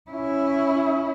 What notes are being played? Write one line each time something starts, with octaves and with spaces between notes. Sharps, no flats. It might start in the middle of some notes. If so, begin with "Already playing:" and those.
C#4 E4